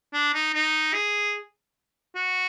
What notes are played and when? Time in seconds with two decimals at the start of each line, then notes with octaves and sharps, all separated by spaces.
0.13 D4
0.34 D#4
0.54 D#4
0.94 G#4
2.15 F#4